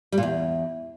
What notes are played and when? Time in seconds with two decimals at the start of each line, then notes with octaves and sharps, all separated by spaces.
0.12 G3
0.18 A#2
0.23 E2